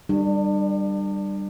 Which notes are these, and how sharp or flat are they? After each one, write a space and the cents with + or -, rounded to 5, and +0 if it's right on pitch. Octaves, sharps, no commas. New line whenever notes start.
G3 +0 D4 +35